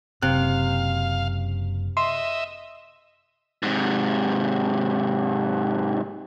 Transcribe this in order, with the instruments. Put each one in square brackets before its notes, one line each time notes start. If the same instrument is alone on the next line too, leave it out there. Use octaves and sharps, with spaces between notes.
[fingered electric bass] F#1 [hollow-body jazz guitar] C3 [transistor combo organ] F5 [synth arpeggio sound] F#6
[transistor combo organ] D#5 E5 [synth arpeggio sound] C6
[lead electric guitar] G#2 C3